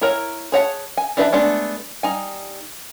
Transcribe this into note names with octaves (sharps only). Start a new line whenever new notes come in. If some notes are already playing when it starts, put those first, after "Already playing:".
E4 A#4 C#5 A#5
G#4 C#5 F#5 A5
G#5
E3 D4 B4 E5 A5
G#3 A3 B3 D4
G3 D#4 G#5